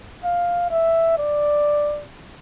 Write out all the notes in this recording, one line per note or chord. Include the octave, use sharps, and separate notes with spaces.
F5
E5
D5